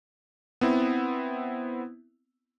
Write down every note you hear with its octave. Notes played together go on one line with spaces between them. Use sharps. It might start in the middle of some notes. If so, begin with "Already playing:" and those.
B3 C4 E4